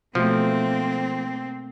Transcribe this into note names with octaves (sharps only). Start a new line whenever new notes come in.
B2 F3 A3 A#3 C4